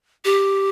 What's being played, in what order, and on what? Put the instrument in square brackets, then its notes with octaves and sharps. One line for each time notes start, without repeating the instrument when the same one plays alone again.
[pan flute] G4